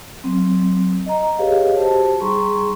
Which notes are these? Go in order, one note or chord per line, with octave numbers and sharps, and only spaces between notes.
F#3 C4
D#5 A#5
G4 G#4 B4 C#5 D#5 F5
F#4 G4 C5 A5
G3 D#4 G#4 A#5 C6 C#6